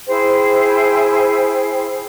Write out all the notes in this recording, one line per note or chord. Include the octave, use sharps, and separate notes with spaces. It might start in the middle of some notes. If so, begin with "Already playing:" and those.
E4 G#4 C5 G5